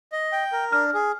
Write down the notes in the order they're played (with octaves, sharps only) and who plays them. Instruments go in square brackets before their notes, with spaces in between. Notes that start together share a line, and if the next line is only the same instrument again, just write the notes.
[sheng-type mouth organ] D#5
G5
A#4
[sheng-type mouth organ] D4 [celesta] F6
[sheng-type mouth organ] G#4